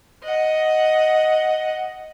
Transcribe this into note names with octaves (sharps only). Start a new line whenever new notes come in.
D#5 F#5